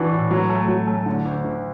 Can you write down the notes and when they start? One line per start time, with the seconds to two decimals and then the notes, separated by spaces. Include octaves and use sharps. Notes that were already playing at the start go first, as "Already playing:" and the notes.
Already playing: E3 D4 F#4
0.12 A2
0.31 F#3
0.50 A3
0.68 F#3
0.87 A3
1.06 D3
1.25 D2
1.44 D2